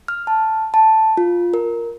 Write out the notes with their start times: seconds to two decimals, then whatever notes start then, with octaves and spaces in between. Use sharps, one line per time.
0.08 F6
0.27 A5
0.74 A5
1.17 F4
1.54 A#4